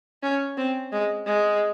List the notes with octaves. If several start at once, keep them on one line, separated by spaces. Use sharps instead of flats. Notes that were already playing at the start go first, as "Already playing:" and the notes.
C#4
C4
G#3
G#3